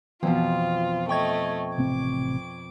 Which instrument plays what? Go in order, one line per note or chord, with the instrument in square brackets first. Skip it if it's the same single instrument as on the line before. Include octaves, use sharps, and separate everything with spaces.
[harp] F2 B2 [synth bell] E3 F3 [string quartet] F4
[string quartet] A3 D#5 [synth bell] G5 C#6 G#6
[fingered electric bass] A1 C3 C4 [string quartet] D6